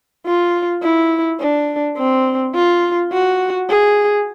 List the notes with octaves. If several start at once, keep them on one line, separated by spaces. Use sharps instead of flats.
F4
E4
D4
C4
F4
F#4
G#4